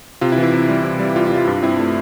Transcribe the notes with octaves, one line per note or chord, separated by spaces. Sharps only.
C3 F4
E4
E3
E4
C3
G3
C3
G3
G3 F4
E4
G3
F4
G2 F4
C4 E4
A3